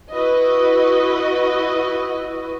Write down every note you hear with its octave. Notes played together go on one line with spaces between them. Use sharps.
E4 F#4 B4 D#5